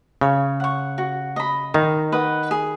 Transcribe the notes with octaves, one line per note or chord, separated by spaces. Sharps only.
C#3 C#5
F#5 C#6
F#4
D#5 B5
D#3 D#4
B4 D#5 F#5
G#4